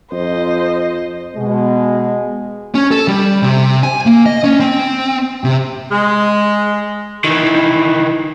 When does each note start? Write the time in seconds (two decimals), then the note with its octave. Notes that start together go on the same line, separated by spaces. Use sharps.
0.12 F2 C5 D#5
1.36 B2 G#3
2.75 C#4
2.91 A4
3.08 G3
3.43 C3
3.83 G#5
4.06 A#3
4.26 D#5
4.44 C#4
4.60 C4
5.44 C3
5.92 G#3
7.24 D#3 E3